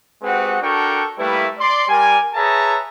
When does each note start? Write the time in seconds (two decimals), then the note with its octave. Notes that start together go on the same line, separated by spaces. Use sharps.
0.23 G#3 C4 F#4 G4 B4 F#5
0.61 D4 F#4 A4 A#4 G5 C#6
1.18 G3 A3 A#3 E4 B4
1.59 D5 C6
1.88 G3 A#4 D5 G#5
2.35 G#4 B4 C#5 E5 A5 A#5